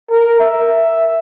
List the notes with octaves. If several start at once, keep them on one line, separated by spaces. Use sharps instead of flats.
A#4
E5